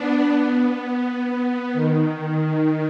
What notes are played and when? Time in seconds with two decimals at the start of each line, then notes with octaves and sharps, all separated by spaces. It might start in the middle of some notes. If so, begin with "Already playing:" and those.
Already playing: B3 D4
0.65 B3
1.73 D#3
2.09 D#3
2.44 D#3